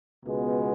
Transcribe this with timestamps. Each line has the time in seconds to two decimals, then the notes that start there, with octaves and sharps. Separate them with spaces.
0.24 C#2 B2 G#3 B3